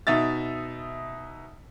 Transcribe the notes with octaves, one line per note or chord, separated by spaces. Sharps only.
B2 D#4 E5 A6